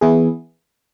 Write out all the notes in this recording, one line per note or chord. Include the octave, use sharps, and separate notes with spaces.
E3 B3 E4 G#4